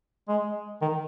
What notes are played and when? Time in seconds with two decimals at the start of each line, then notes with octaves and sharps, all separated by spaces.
0.28 G#3
0.81 D#3